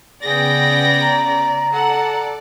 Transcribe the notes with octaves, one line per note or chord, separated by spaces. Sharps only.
C#3 B3 G#4 D5 G5 A#6
A#5
A4 D5 F#5